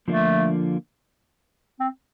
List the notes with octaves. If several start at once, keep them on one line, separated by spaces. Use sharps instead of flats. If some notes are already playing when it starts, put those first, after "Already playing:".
D3 F3 A3 A#3 D4 F4
C4